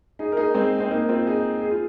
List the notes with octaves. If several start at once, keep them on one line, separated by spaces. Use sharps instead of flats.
D#4 G#4
A#4
D#4 G#4
G#3 C4
C4
A#3 D#4
C4 F4
D#4 G#4
G#4
F4